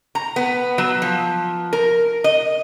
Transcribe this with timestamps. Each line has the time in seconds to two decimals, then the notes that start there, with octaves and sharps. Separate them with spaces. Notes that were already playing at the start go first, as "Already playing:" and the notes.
0.15 A#5
0.36 B3
0.78 F#3
1.02 F3
1.73 A#4
2.24 D#5